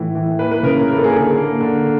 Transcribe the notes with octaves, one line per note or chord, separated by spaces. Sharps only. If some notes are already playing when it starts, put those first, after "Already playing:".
Already playing: A2 E3
E3
A#3 B4
B4
C#3 A#4
A#3 A#4
A4
G#4
D3 A4
A#3
D3